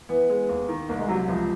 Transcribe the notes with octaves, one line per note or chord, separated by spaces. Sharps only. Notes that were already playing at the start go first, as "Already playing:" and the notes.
E3 B3
G#3
D#2
D#3
C2 A#3
G#3
C3 F#3
F#3
C#2 F3